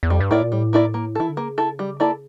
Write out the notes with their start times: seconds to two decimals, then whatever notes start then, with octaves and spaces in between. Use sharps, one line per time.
0.03 E2
0.09 F2 G3
0.20 G2
0.31 A2 A#3 E4 A#4 D5
0.42 A#2
0.52 A2 G3
0.73 A#3 E4 A#4 D5
0.94 A#3
1.15 E3 E4 A4
1.29 D3
1.37 C#3 A#3
1.58 E4 A4
1.79 G3
2.00 A#3 E4 A4 D5